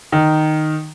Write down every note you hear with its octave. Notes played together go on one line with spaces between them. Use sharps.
D#3